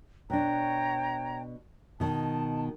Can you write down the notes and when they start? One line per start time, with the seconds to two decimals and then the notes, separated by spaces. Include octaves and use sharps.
0.30 B2 D4 C#5 G5 A#5
2.00 B2 D#3 A5